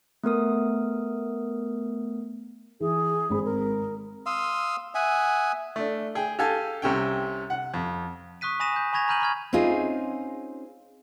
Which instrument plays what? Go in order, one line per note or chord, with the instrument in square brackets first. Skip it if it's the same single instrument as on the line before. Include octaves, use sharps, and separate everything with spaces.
[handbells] A3 B3 A#4 D#6
[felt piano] E3 [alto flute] G#4
[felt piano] G#1 C4 B5
[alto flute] A#4
[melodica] F5 C6 D#6 E6
E5 F#5 G#5 D#6
[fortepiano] A3 D4
G#4 G5
G4 A4 F5 G#5 A5
C2 C3 C#4 G5
F#5
F2
[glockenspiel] C#6 D#6 F#6 B6 D#7
G#5 B5 D#6 A#6 D#7 E7
G6
G#5 B5 C#6 G#6 A#6 F7
A#5 B5 F6 G6 D#7 F#7
B5 C#6 F6 G#6
[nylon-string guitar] C4 C#4 D#4 F4 G#4